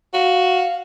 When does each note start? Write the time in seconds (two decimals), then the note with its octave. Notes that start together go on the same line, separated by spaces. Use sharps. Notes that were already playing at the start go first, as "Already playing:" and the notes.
0.14 F#4 F5